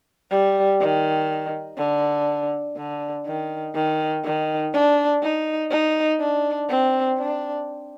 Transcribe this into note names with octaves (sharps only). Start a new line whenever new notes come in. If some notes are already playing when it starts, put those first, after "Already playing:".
G3
D#3
D3
D3
D#3
D#3
D#3
D4
D#4
D#4
D4
C4
D4